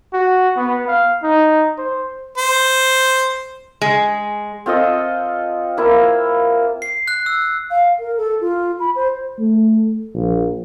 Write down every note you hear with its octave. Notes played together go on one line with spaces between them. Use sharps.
F#4
B3
F5
D#4
C5
C5
G#3
C4 F4 A4 D#5
A#3 E4 F4
C7
F#6
E6
F5
A#4
A4
F4
B5
C5
A3
A#1